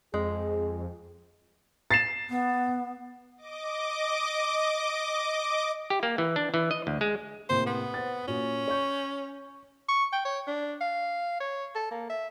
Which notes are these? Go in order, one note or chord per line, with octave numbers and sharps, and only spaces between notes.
F2 G#3 G#4
A6 C7 E7
B3
D#5 D6
G4
A#3
E3
D4
E3
D#5
D2
G#3
A2 C3 A#3 C5
B3
C5 F#5 A6
A#2 C#4 F#4
C#5 C#6 G6
C#6
G5
C#5
D4
F5
C#5
A4
A#3
E5